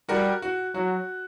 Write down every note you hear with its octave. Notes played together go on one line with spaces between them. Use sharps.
G3 F#4 A#4
F#4
F#3 F#4